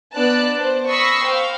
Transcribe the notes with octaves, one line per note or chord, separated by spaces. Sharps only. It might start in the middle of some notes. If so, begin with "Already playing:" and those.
B3 D4 D5 A5 F#6
C5
B5 C#6 D#6 E6 A#6 C7
C5 F5 G5